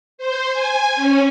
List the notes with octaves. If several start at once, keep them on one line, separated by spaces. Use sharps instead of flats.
C5
G#5
C#4